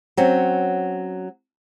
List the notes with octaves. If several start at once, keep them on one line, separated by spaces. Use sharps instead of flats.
F#3 C4 C#4